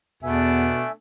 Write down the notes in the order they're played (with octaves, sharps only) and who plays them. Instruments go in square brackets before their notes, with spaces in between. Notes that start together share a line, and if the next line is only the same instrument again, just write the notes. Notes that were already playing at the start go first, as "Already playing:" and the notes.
[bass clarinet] E2 [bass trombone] B2 [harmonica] A3 B3 D4 [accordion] E5 G#5